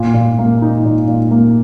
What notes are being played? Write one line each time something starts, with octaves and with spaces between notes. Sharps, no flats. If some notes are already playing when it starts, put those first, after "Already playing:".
Already playing: A#2
A#2
A#3
D#4
A#2
A#2
A#3